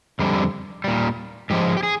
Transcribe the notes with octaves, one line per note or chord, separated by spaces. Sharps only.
F2 D3 G3
A#2 G3
G#2 F3 G#3 G4
G4
G#4